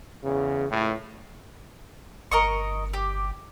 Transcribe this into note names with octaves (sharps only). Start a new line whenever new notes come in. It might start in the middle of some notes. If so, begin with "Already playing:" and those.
E2 C#3
C#2 A2
G1 A#4 D#5 C#6
G4